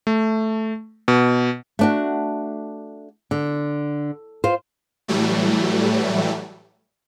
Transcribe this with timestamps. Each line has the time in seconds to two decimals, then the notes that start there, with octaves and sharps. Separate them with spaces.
0.07 A3
1.08 B2
1.79 A3 D4 F#4
3.31 D3
4.44 F4 C5
5.08 A2 E3 F#3 G3 A3